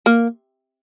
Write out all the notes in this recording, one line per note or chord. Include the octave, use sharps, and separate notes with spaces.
A#3